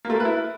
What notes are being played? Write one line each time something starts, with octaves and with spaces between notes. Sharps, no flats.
A#3
A3
A#3
B4
E4